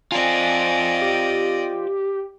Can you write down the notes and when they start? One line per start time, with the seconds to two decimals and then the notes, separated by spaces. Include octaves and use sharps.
0.12 C4 F4 D5 D#5 G#5
1.02 G4